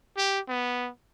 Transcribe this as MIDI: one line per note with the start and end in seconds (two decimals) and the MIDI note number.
0.17 0.40 67
0.48 0.90 59